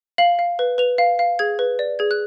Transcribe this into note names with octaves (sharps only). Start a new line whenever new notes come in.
F5 F#7
F5
B4
B4 F7
F5
F5
G#4 G#6
B4
D5
G#4 G#6
F#6